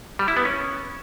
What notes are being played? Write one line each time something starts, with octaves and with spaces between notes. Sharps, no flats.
G3
E4
B3
C#4